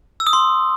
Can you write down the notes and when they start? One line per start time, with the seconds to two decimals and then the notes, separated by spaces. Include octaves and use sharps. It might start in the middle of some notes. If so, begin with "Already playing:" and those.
0.20 E6
0.27 D#6
0.33 C6